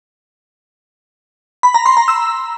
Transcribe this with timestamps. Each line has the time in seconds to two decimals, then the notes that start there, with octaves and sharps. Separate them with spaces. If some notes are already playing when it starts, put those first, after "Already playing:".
1.63 B5
1.74 A#5
1.86 C6
1.97 A#5
2.08 E6